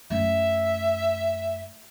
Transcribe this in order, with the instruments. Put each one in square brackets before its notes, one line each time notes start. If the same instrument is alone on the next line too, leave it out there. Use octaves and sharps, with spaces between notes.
[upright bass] F#2 A3 [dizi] E5